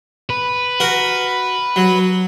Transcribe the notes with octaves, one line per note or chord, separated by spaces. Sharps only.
B4
F#4 A#4
F#3